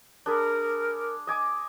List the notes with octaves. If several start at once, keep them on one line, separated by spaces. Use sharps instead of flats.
D4 G#4 A#4 B5
D#5 G#5 D6